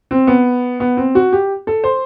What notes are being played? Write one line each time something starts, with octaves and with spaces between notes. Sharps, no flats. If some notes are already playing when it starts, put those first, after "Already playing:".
C4
B3
B3
C4
F#4
G4
A4
C5